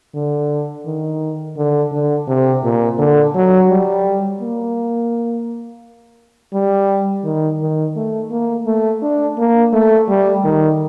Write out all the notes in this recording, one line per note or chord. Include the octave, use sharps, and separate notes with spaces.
D3
D#3
D3
D3
C3
A#2
D3
F#3
G3
A#3
G3
D#3
D#3
A3
A#3
A3
D4
A#3
A3
G3
D#3